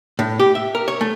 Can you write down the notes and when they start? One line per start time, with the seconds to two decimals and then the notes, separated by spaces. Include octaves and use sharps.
0.19 A2
0.39 G4
0.55 E5
0.75 A#4
0.88 C#5
1.01 A3